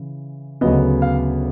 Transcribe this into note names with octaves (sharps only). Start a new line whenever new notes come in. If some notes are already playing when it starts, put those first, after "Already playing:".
Already playing: C#3 E3
D2 C#3 F#3 B3 D#5
F5